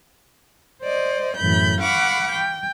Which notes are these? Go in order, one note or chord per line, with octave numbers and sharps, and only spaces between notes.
C5 D5 D#5
F#2 A2 E3 B5 G6
F5 F#5 B5 C#6 D6
G5